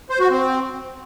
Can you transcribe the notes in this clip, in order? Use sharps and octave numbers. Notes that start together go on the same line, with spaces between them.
C5
F#4
C4